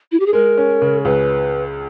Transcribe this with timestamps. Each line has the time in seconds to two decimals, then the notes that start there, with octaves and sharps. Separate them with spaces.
0.12 E4
0.20 G4
0.26 G#4
0.33 G#3 A#4
0.57 C#4
0.82 C#3
1.05 C#2 B4